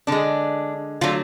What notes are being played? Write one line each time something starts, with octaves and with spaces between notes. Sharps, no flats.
D3 G#3 D4
D3 F#3 A3 F4